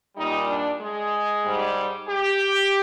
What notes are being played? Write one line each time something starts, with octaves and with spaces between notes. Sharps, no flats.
A#2 G3 D#4
D4
G#3
G#2 G3
G4